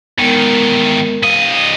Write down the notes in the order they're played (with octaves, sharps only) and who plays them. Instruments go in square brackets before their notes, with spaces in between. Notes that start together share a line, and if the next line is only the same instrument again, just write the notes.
[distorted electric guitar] E2 D#3 [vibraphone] G#3 B3 A#4
[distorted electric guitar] G2 D#5 [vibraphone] F5